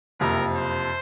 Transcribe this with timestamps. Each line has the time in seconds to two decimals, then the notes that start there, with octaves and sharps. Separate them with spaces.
0.20 F#1 F2 C3 A#4
0.56 C5